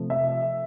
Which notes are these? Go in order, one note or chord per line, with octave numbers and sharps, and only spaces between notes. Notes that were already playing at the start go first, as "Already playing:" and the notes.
Already playing: C3 F3 A3
E5